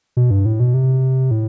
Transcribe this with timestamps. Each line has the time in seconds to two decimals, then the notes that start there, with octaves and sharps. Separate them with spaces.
0.17 B2
0.31 G2
0.46 A2
0.60 B2
0.74 C3
1.31 A2